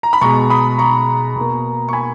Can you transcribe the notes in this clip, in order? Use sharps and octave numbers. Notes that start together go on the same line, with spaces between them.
A#5
B5
B2 G#3 A#5 C#6
B5 D#6
A#5 C#6
B2 A#3
C#6
G#5 B5